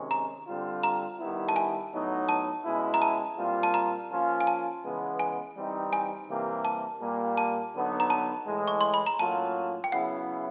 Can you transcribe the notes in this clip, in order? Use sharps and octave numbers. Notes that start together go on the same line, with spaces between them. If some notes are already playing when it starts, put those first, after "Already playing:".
Already playing: C3 D#3 G#3 C#4
A#5
D3 G3 C4 F4
A#5
D#3 G3 B3 E4
A5
G#5
A2 F#3 B3 D#4
A5
B2 G#3 C#4 E4
A#5
A5
A#2 G3 C4 F4
A5
A#5
F3 A#3 C#4 F4
G#5
A5
C#3 E3 G#3 B3
G#5
E3 G3 C4 D#4
G#5
C3 E3 G3 A#3
A5
A#2 G3 A#3
A5
D3 F#3 B3 D#4
A#5
A5
A2 E3 G#3
C#6
C6
B5
A#5
A2 F#3 A#3 C#4 F4 A5
G5
C#3 F#3 B3 E4 F#5